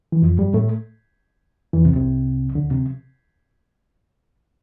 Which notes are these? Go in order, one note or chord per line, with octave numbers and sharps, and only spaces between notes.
E3
F2 F3
G2 G3
A2 A3
E2 E3
C2 C3
C2 C3
D2 D3
C3